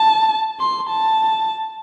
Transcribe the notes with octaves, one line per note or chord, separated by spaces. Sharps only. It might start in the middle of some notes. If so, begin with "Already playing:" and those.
Already playing: A5
C6
A5